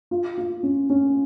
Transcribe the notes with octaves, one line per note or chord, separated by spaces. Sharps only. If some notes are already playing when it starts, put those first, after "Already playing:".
F4
F4
C#4
C#4